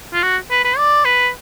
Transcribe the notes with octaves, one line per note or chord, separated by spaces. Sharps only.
F4
F#4
B4
B4
D5
B4